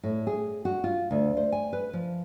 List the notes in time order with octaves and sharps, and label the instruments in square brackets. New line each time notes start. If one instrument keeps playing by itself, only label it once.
[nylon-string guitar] A2
G#4
F#4
F4
D2
C5
G#5
B4
F3